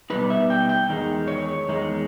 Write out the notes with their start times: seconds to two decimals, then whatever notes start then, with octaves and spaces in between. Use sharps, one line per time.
0.10 B2 G3 B3 D#4 B4
0.30 E5
0.50 G5
0.69 G5
0.89 E2 D#3 G#3 D#4
1.28 C#5
1.68 E2 D#3 G#3 D#4